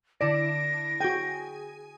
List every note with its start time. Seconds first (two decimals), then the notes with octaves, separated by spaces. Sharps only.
0.21 D3 E4 D5 A#6 D7
1.01 F#4 G#4 G5 G#5